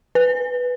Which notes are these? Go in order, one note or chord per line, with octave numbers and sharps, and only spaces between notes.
B4